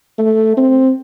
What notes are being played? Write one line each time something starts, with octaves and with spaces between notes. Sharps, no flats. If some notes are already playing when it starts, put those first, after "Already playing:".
A3
C4